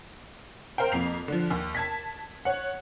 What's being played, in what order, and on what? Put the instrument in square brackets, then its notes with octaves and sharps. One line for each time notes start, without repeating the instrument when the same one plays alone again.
[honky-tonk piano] A#4 C5 F5 G5
F2 A#3 C7 F7
D3 F3
D#2
A5 G#6 B6
C#5 F#5